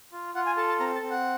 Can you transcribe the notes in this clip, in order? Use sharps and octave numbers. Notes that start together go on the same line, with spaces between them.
F4
F4 F#5
G#5
A4 A5
A5
C4 A#5
A5
C4
F#5